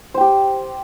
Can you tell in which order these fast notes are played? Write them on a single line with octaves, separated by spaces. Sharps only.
C5 G5 G4